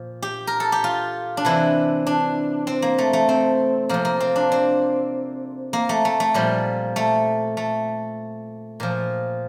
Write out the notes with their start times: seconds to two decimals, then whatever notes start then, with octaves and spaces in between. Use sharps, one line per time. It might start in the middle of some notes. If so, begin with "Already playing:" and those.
Already playing: A#2 F3
0.22 G4
0.47 A#4
0.60 A4
0.72 G4
0.84 F4
1.37 D4
1.45 C3 E3 E4
2.07 D4
2.67 C4
2.82 A#3
2.98 A3
3.13 A3
3.29 C4
3.89 C3 F3 A#3
4.05 A#3
4.20 C4
4.36 D4
4.52 C4
5.73 A#3
5.89 A3
6.05 A3
6.20 A3
6.34 A#2 F3 G3
6.96 A3
7.57 A3
8.80 A#2 F3